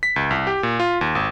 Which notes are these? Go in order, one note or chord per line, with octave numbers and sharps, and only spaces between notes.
B6
C#2
C2
G4
A#2
F4
D#2
G#1